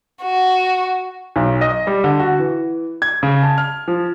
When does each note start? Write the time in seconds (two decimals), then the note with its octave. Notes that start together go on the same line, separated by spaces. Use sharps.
0.23 F#4
1.36 B1
1.61 D#5
1.87 G3
2.04 D3
2.20 F#4
2.39 E3
3.02 G#6
3.23 C#3
3.43 A5
3.58 F6
3.88 F3